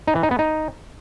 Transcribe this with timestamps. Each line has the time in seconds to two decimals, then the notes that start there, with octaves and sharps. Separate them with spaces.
0.07 D#4
0.15 E3
0.23 D#4
0.31 B3
0.39 D#4